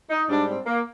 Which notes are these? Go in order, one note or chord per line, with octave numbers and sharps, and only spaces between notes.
D#4
G#2 G3 D4
C4
A#3